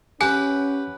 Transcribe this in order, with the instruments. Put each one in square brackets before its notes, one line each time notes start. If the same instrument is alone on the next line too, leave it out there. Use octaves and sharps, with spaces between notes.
[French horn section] C#4 [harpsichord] G4 [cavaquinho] B4 F#5 [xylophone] G#5